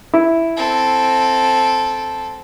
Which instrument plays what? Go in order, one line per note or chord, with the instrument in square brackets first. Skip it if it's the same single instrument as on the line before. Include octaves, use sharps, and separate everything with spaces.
[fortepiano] E4
[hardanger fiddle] C4 A4